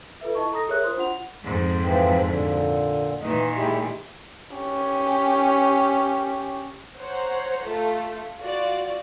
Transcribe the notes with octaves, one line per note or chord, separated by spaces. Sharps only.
F4 A4 B4 E5
E4 D#5 A5 C#6
A4 A#5 D#6 A#6
G4 G#4 A#4 C#5 E5 F#6
F4 C5 C6 D#6
D4 F4 F#5 F7
F2 G#2
E3 F3 C4
A#2 D3
A#2 D#3 E3 D#5
G#3 E4 G4
C#4 G4
C5 C#5 F#5 A#5
A3 F4 A4
F4 F#4 D5